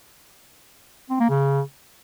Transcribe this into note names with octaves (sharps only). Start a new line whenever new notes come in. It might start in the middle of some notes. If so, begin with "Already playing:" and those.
C4
A#3
C#3